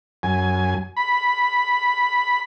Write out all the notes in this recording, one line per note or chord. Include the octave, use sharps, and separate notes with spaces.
F#2 G#5
B5